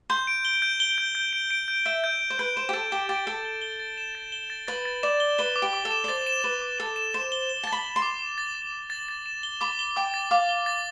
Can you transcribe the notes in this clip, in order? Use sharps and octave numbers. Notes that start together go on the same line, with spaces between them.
C6 G6
D7
G7
G6
G7
G6
G6
D7
D7
G6
E5 G6
G6
D7
C5
B4 G6
C5 E7
G4
A4 A6
G4 G7
G4 A6
A4 G7
G7
G7
A6
E7
A6
G7
A6
B4 A6
A6
D5 E7
G7
B4 G7
D6
G4
D6
A4
E7
D5
C5 A6
E7
B4 E7
D6
A4 E7
E7
C5 E7
G7
G7
A5
A6
B5
G7
C6
D6
E7
A6
A6
D6
A6
A6
E7
G7
B5 D6
G7
G5 D6
A6
F5 D6
G7
A6